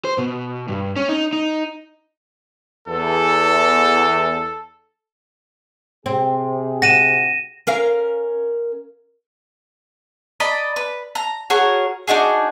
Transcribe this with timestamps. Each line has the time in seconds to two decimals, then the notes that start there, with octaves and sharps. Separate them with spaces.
0.05 C5
0.18 B2
0.68 G2
0.96 C#4
1.09 D#4
1.33 D#4
2.88 E2 A4
6.06 C3 C4 G#4
6.82 F#4 A#6 D#7 E7
7.67 C#4 A#4 F5
10.40 D5 D#5 A#5 B5
10.76 B4
11.15 A#5
11.50 F#4 G#4 A#4 C#5
12.08 D4 D#4 F#4 G#4